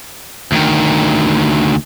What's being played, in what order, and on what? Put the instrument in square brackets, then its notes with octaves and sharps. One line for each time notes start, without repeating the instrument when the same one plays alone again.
[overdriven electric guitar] D2 D#3